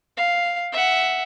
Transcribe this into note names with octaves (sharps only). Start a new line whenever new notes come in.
F5
E5 F#5